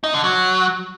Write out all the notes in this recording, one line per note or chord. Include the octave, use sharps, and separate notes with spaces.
D#4
D3
F#3